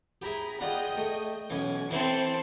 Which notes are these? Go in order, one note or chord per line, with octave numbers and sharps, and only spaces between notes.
E4 G4 G#4 A#5 B5
F4 G#4 D5 D#5 F#5 G5
A3
B1 E3 C#4 G#6
E3 C4 E4 A4